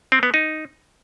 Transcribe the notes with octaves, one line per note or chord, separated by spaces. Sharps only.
C4
B3
D#4